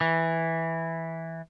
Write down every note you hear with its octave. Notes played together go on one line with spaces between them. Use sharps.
E3